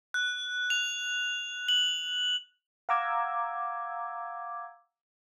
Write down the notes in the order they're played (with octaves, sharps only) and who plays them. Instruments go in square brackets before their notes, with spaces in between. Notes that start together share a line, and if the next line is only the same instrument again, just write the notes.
[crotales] F#6
F7
F#7
[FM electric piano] F5 F#5 A#5 D6 E6 G#6